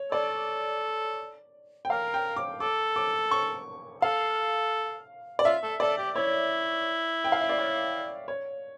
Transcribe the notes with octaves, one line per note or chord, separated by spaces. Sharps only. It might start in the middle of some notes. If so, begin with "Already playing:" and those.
Already playing: C#5
A4 D5
G5
A#4 F5
G5
D6
A4 D6
D6
C#6
A4 F5
D5
F4 E5
A4
A4 D5
G4
E4 C#5
G5
F5
E5
D5
C#5
C#5